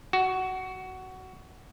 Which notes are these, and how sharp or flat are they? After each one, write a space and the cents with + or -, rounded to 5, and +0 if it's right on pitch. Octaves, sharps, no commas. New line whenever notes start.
F#4 +15